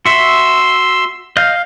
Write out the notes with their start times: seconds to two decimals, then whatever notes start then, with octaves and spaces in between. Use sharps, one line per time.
0.06 F#4 E5 C6 E6
1.37 D#5 F5 F6 G6